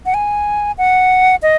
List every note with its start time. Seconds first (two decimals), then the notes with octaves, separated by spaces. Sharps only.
0.06 F#5
0.14 G#5
0.78 F#5
1.43 D#5